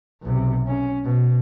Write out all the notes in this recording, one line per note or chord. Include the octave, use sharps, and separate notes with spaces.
B1 C3
C#4
B2